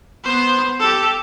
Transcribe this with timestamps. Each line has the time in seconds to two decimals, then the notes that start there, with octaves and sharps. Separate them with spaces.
0.24 B3 C5
0.79 G4 A4